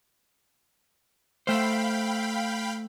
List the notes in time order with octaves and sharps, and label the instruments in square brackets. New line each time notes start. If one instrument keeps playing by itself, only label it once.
[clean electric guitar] A3 C5 [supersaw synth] F5 G5 B5